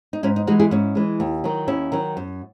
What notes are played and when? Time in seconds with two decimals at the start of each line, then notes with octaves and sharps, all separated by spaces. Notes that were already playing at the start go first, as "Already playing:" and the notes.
0.13 D#4
0.23 G#2 C#4 E4
0.36 D#4
0.47 E3 G#3 D#4 F#4
0.60 E4 G#4
0.71 G#2 C#4 E4
0.95 E3 G#3
1.20 D#2
1.44 D#3 F#3
1.67 D#2 C#4 E4
1.92 D#3 F#3
2.17 F#2